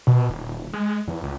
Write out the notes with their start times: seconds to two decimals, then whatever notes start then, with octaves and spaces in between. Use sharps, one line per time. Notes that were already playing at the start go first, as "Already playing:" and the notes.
0.07 B2
0.29 D#1
0.73 G#3
1.07 E2
1.23 C#2